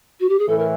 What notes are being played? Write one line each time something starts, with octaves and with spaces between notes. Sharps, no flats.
F#4
G4
G#4
A2 E3 A4
A#4